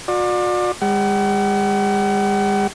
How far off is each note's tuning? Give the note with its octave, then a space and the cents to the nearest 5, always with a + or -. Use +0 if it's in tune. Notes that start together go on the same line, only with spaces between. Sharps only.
F#4 -45 D5 +25
G#3 -45 F#5 +40